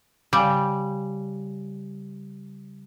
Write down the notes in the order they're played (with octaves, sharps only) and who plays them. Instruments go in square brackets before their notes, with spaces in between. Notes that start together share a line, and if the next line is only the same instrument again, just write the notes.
[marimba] C#3 F5 G#5 [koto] G3